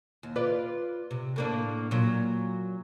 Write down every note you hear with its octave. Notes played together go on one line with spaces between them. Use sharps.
D#2
F4 B4 D5
C3
A2 A#3 D4
A#2 F#3